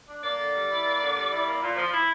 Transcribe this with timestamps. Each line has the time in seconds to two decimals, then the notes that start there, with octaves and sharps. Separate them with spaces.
0.08 D4
0.23 A#3 D5
0.38 D3
0.54 G3
0.70 E4
0.85 A#3
1.00 D3
1.15 G3
1.31 E4
1.47 A#3
1.62 A#2
1.76 F3
1.93 E4